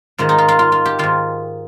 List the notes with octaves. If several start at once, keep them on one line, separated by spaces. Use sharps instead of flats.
G#2 D#3 F4
D#4
F4
F4
F4
F4
G4
G#2 D#3 F4